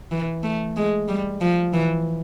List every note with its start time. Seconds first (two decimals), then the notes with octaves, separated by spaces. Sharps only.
0.12 E3
0.43 A3
0.77 G#3
1.08 G3
1.41 F3
1.73 E3